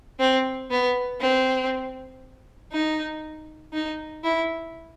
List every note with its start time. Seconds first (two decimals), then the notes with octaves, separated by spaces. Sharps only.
0.19 C4
0.71 B3
1.21 C4
2.72 D#4
3.73 D#4
4.24 E4